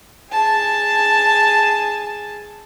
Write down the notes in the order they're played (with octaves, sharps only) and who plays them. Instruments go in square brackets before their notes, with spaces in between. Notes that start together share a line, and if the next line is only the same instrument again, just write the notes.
[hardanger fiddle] G#4 A5